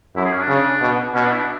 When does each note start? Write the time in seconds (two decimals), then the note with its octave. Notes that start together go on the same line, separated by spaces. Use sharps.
0.16 F#2 E4
0.24 G#4
0.33 C#4
0.40 D4
0.48 C#3
0.81 B2
1.14 B2 C#4
1.22 D4
1.31 E4
1.39 D4